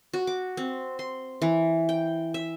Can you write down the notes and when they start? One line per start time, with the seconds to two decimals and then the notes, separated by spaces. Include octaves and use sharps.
0.13 F#4
0.27 D6
0.57 C4
0.99 C6
1.42 E3
1.89 G5
2.34 E5